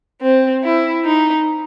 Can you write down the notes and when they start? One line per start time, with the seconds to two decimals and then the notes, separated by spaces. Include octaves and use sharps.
0.22 C4
0.63 E4
1.05 D#4